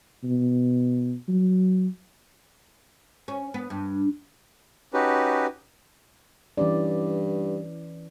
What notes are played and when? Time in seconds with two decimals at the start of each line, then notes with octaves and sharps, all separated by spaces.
0.24 B2
1.28 F#3
3.28 C#4
3.54 B3
3.70 G2
4.93 C#4 D#4 F#4 G4 B4
6.58 G2 E3 C#4 D5